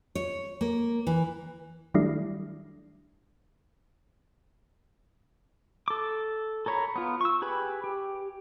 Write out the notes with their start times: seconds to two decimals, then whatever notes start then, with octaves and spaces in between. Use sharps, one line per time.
0.15 C#5
0.61 A#3
1.07 E3
1.94 D#3 F#3 G3 A3 D4 E4
5.88 A4 D6
6.66 A4 A#4 C#5 A#5 B5
6.96 B3 F4
7.21 C#6 E6
7.42 G4 G#4 B4 B5
7.84 G4